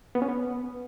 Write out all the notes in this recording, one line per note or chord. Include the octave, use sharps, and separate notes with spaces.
B3
C#4
B3